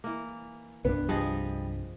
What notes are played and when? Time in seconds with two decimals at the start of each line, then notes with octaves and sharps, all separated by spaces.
0.04 E3 A#3
0.85 C2 G2 B3 D4
1.09 F3 G3 G#4 D#5 D#6